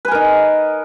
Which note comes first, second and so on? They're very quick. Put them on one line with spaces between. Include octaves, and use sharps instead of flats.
B4 G#5 A#4 D#4